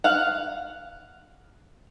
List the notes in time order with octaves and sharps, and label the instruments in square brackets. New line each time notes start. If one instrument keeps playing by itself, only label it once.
[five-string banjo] F5 F#5